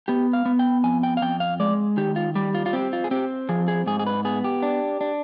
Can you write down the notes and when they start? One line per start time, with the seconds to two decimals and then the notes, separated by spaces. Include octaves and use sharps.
0.08 B3 G4
0.33 F5
0.46 B3
0.59 G5
0.84 F2 G#5
1.03 G5
1.17 F5
1.22 F2 G5
1.40 F5
1.60 G#3 D5
1.97 D#3 G4
2.16 F4
2.35 G3 G4
2.55 F4
2.66 F4
2.73 C4 G4
2.93 F4
3.04 G#4
3.11 C4 G4
3.49 F3 G#4
3.68 G#4
3.86 G#2 G#4
3.99 G#4
4.07 B4
4.25 B3 G#4
4.44 G4
4.62 D4
5.01 D4